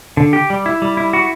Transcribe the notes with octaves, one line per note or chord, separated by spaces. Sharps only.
D3
G4
G3
E4
G3
E4
F#4